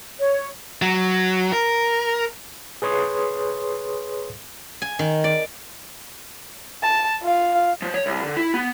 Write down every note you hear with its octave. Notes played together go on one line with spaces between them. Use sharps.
C#5
F#3
A#4
G#4 B4 C#5 C6 D#6
G#5
D#3
D5
A5
F4 F5
F3
C#5
C2
D3
E4
B3